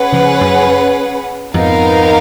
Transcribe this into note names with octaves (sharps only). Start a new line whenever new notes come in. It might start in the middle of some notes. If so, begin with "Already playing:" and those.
Already playing: C#4 G#4 B4 F#5
C#3 F3
F#2
F2 G#2 B3 D#4 A#4 F5